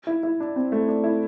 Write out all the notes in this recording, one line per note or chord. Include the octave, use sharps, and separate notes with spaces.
E4
E4
D4
C4
A3
D4
E4